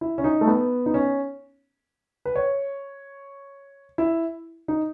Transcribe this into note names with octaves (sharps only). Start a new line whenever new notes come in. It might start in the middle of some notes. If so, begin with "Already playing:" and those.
E4
C#4
D#4
A3
B3
D#4
C#4
B4
C#5
E4
D#4